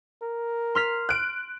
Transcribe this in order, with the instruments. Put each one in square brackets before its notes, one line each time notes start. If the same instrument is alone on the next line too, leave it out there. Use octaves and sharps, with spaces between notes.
[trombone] A#4
[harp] C6 F6 B6
[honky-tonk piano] F#6 D7